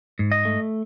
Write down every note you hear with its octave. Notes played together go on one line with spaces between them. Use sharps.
G#2
D#5
A3